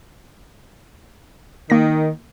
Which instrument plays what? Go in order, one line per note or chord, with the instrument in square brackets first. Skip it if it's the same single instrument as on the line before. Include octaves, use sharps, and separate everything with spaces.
[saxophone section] D#3 [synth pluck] A#3 A#6